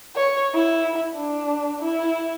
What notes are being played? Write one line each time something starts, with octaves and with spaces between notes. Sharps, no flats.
C#5
E4
D4
E4